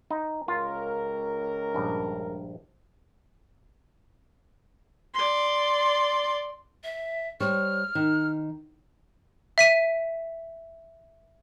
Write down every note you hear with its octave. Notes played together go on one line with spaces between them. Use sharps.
D#4
C#2 C#4 F4 A#4
A#1 G2
D5 C6
E5
G3 C5 C#5 F6
D#3
E5 B6 D#7